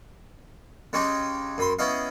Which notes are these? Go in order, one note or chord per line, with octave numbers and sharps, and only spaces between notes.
C#3 G#3 C#4 D#4 G4
F#2 B5 C6
B3 C#4 E4 D#5 F5